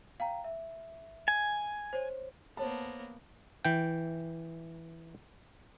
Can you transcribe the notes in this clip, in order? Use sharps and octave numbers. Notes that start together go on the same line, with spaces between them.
F5 G5 A#5
E5
G#5
C5 C#5
A#3 B3 C5 C#5 A5
E3 G5